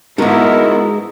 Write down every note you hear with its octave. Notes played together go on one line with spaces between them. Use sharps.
G#2 G#3 B3 D#4 E4 F#4 G#4 A#4